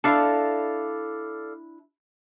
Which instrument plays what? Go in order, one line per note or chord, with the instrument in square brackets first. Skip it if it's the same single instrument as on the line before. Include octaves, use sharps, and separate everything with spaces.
[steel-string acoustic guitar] D4 E4 A#5 [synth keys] A4 D5 F5